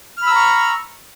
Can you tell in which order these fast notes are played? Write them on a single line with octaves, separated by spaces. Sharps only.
F6 B5 E6 A#5 C#6